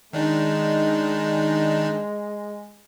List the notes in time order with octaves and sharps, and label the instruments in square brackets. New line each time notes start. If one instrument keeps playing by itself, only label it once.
[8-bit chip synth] D#3 D4 D#4 [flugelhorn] G#3